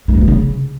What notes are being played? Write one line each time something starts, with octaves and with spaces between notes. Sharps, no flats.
A3
A#3
B3
C#3